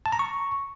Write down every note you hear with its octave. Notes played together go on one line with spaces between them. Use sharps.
A5
A#5
C#6